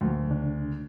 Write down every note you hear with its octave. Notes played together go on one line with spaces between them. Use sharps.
D2 F3 F#3 A#3
E2 C#3 D4